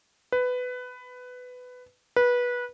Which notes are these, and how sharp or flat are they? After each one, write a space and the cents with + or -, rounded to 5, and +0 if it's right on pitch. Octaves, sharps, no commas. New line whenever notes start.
B4 +15
B4 -20